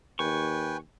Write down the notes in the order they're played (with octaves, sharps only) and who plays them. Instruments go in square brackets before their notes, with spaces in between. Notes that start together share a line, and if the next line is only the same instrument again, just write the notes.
[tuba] D#2 [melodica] B4 G5 G#5 [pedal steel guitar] C#6